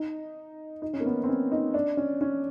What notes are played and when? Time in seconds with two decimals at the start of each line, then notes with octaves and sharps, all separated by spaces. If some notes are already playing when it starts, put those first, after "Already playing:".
Already playing: D#4
0.82 D#4
0.94 C#4
1.00 A#3
1.06 B3
1.24 C4
1.29 C#4
1.52 D#4
1.74 D4
1.97 C#4
2.21 C#4